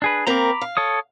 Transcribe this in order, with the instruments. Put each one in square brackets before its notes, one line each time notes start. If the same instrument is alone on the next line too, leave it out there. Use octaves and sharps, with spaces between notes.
[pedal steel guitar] D4 G#4 B4
[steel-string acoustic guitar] A#3 C4 A#4 [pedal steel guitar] A#5 B5 D6
[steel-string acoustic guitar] F5
[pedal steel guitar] A4 C#5 D#6